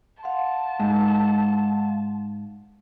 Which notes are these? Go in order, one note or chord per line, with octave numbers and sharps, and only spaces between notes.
F5 F#5 A5 C6
G#2